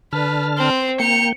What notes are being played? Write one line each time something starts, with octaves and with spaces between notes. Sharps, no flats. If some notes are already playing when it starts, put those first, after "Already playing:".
D3 B4 A5 F6
C4 C5
A#3 G5 C#7 F7